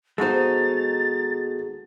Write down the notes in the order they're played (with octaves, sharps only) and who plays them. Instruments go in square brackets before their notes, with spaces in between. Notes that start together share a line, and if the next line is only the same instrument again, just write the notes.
[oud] D#2 C5 [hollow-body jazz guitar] G#3 D#4 [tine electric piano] B3 F#4 A4 [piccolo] A6